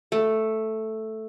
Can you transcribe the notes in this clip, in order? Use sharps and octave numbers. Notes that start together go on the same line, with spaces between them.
A3